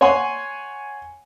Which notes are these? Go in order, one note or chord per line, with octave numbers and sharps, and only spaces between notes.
C#5 F#5 G#5 C6